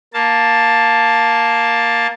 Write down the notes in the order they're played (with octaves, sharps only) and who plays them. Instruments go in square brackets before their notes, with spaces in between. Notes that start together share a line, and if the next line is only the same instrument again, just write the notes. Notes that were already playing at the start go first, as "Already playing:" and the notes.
[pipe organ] A#3 A5